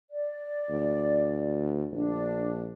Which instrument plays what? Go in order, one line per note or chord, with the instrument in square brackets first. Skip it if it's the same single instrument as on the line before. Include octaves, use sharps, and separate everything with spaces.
[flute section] D5
[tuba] D2
[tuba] A#1 [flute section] D4